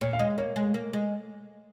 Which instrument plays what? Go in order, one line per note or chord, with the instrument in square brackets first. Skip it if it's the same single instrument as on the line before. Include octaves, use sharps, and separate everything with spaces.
[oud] A#2 [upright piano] C#5
[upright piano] F5
[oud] G#3 [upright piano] D#5
[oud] A#3 [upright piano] C#5
[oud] G#3
A#3
G#3